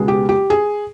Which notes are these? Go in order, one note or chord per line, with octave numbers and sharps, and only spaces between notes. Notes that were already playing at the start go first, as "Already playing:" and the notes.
Already playing: C#2 B2 G#3 B3
G4
G4
G#4